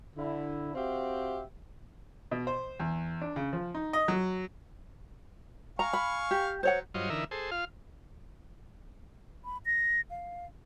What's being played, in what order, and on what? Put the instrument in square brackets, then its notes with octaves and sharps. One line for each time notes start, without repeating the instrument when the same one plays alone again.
[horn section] D3 E4
C4 F#4 G4 C5 E5 F5
[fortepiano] B2
C5
E2
D4
C#3
F3
D#4
D#5
F#3
[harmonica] F5 G#5 C#6 [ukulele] A#5
[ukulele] B5
G4
[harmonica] F#3 [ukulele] C5 C#5 F#5
[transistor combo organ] G2 F#3 F4 C5 C#5 D#5
D3 E3 D#4 A#4 E5
G#4 A4 C5
F4 F5
[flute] B5
A#6
F5